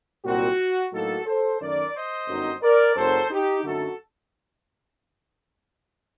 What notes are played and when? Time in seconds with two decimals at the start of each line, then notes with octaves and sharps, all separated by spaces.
0.25 C2 A#2 F#3 C4 F#4
0.92 A2 F#3 A#3 D#4 F#4 A4
1.26 A4 C5
1.60 F#2 D#3 A3 A#4 D5
1.94 C5 D#5
2.28 G1 F#2 F#3 C4 D#4
2.61 A#4 D5
2.95 F#1 F#2 F#3 A4 C5
3.30 D#4 G4
3.63 F#2 D3 F#3 A3 D#4 F#4 A4